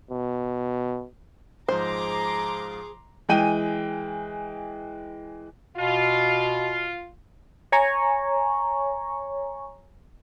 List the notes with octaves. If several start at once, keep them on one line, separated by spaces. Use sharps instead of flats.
B2
G#2 F3 G#4 C5 A#5 C6 D6
E3 G#3 G5 D#7
B2 F4
C#5 G#5 A#5 C#6